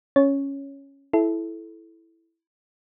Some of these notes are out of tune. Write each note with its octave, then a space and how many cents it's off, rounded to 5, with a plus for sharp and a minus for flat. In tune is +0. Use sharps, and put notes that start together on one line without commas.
C#4 -5 C#5 +0
E4 +0 A4 -20